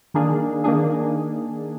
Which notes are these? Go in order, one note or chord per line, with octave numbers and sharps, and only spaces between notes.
D#3 A#3 D4 G#4
D#3 A#3 D4 G#4